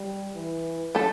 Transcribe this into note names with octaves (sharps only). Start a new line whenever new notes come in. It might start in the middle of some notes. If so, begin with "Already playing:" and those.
Already playing: G3
E3
A3 A4